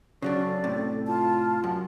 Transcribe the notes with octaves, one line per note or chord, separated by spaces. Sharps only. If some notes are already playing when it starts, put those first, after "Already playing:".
C#3 F#3 C#4 D4 D5
A4
A2 C3
F4 A5
F#2